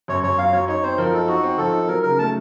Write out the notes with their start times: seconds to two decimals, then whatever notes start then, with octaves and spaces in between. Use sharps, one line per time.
0.08 F#2 C#5
0.23 F#2 C#5
0.38 F#3 F5
0.53 F#3 C#5
0.68 D#4 C#5
0.83 C4 C5
0.98 F3 A#4
1.13 D#4 A4
1.28 D#4 F#4
1.43 C4
1.58 F3 A4
1.73 D#4
1.88 F#3 A#4
2.03 C#3 A#4
2.19 A3 A5